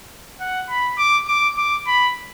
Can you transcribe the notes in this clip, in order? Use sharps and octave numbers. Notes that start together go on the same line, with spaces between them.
F#5
B5
D6
D6
D6
B5